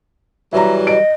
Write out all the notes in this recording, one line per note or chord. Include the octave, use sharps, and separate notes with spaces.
E3 F#3 G3 E5 A#5
D#5 D7